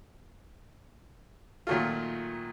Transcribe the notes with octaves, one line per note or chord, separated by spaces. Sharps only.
A#2 D#3 F#3 A3 F4